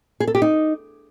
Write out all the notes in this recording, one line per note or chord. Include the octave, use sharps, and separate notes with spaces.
G#4
A4
G4
D#4